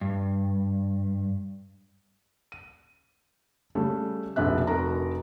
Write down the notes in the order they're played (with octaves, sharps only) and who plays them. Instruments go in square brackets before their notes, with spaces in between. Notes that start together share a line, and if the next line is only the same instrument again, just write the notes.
[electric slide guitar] G2
[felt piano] D#7
C#3 G3 A3
F1 A#1 B2 E5 F#6
F1 F#4 A#4 A#5